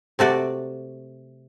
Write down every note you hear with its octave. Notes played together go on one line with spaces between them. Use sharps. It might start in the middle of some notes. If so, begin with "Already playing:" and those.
C3 A3 F#4 D5